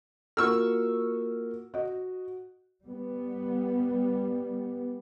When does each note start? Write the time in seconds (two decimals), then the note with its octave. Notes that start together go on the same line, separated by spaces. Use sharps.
0.37 A#3 F4 F#4 C#6 E6 F6
1.74 F#4 D#5
2.84 G3 B3